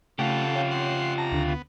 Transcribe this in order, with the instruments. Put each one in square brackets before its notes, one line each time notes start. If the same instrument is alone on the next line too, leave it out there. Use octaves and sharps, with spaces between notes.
[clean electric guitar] C#3 [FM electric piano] A3 [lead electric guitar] F4 G4 [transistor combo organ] A4 F#5 G5
[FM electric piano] C#5 F5
[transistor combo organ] F#5 C6
[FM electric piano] A5 [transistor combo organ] A#5
[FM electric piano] D2 D3
[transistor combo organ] B3